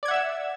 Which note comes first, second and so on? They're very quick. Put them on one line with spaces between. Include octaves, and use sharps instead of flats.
D5 G#6 F#5 E5 E6